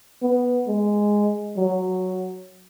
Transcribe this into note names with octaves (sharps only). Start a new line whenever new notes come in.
B3
G#3
F#3